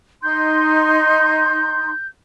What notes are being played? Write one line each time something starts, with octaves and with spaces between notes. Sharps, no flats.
D#4 C6 G6